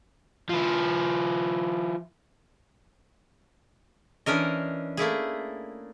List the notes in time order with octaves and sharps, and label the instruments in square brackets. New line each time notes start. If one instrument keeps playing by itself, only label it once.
[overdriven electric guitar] F3 E4
[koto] E3 C#4 D4 A#4 D#5
A3 A#3 E4 G#4